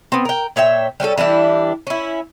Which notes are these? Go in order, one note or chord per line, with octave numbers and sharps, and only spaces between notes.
B3 C4
A#4 G5
A#2 C#5 E5 G5
G3 C#4 F#4 A4
E3 G3 D4 E4
C#4 E4